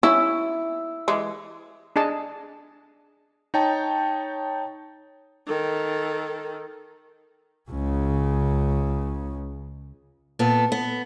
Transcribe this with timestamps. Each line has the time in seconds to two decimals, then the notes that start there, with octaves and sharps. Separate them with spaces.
0.03 C#4 E4
1.08 E3 G#3
1.96 D4 G#4 D#5 A5
3.54 D#4 C#5 G5 A5
5.47 D#3 A4
7.70 C#2 C#3
10.39 A#2 B3 A4
10.72 B3